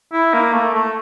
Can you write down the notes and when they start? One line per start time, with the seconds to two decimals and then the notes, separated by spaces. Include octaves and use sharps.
0.13 E4
0.34 A#3
0.54 A3
0.75 A3